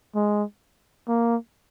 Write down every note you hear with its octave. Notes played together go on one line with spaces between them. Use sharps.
G#3
A#3